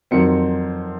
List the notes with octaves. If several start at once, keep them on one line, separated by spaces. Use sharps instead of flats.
F2 D#3 F#3 C4 C#7